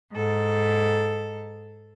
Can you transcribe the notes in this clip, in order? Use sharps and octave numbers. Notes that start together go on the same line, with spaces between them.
G#2 A4